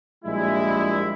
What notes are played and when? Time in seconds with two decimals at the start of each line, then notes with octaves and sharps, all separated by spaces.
0.25 A#1 G3 G#3 E4